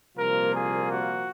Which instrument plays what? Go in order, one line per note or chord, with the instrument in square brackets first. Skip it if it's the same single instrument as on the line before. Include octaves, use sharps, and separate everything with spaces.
[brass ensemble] C2 A#2 F3 A#3 F4 A#4
G#4
F#4